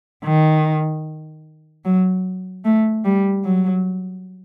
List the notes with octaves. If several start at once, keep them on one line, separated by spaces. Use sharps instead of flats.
D#3
F#3
A3
G3
F#3